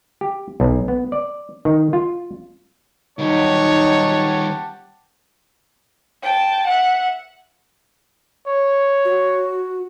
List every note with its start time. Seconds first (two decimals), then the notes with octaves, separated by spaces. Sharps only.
0.21 G4
0.60 B1
0.88 B3
1.12 D5
1.65 D#3
1.93 F4
3.19 D#3 F#3 G3 D#4 G4 C#5 F#5 A5
6.23 G5 A5
6.67 E5 F#5
8.47 C#5
9.05 F#4